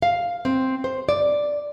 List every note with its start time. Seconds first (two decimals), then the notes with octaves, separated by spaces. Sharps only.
0.02 F5
0.45 C4
0.84 C5
1.09 D5